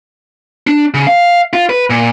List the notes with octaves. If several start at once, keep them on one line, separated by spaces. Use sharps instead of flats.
D4
C#3
F5
F4
B4
A#2